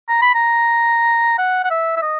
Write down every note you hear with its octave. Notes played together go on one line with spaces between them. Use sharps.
A#5
B5
A#5
F#5
F#5
E5
E5
D#5